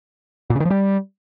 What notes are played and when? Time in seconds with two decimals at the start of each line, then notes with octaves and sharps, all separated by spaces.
0.50 A#2
0.55 C#3
0.60 D#3
0.65 F3
0.70 G3